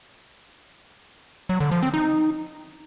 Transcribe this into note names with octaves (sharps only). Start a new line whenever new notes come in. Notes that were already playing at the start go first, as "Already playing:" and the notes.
F#3
D3
F3
C4
D#4